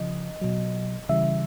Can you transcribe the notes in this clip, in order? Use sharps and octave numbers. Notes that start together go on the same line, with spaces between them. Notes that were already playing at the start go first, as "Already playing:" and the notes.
Already playing: C#3 F3 D#5
B2 F#3
C#3 E3 G3 E5